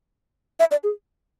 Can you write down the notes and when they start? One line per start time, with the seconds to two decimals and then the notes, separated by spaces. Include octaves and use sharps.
0.60 E5
0.71 D5
0.84 G#4